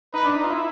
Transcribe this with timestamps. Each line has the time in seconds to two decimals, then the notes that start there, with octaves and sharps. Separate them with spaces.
0.13 D#4 B4
0.25 D4
0.35 D#4
0.44 F4
0.50 E4